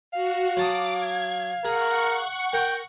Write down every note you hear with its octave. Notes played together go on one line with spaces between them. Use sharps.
F#4 F5
F#3 A5 D6 D#6
G#6
G#4 A#4 F#5 C#6
A#4 G5